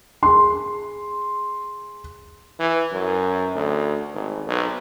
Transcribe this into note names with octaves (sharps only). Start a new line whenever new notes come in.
G#4 C6
E3
F#2
D2
G#1
B1